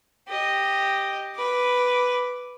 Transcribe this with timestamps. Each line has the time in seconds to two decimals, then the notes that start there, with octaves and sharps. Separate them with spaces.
0.28 G4 D#5
1.36 B4 D6